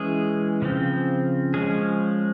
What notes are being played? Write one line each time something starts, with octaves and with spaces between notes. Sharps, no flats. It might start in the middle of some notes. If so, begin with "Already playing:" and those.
Already playing: E3 G#3 C#4 G#4
C#3 F3 C4
F3 G#3 C#4 G#4